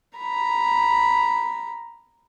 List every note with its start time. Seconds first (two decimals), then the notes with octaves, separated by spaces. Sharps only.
0.17 A#5 B5